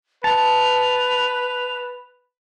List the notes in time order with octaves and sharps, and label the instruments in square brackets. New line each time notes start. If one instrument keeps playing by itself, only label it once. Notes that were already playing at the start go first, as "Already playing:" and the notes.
[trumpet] B4 [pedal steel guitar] A5 [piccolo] F7